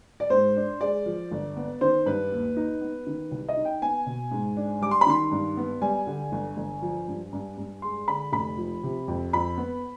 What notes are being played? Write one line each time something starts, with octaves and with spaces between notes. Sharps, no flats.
D5
G#2 C5
D4
G#3 D5
F3
G1
B3
D#3 C5
G2 B4
D#2
D#4
B3
D#3
C2
D#5
D#4
G5
B3 G#5
B2
G#2
D4
G3 D6
C6
B5
D#3 C6
G2
B3
G3 G#5
D3
G1
G1
F3
G2
G2
G2
G#3 C6
D3 B5
F1 B5
F3
C3
F2
F2 B5
B3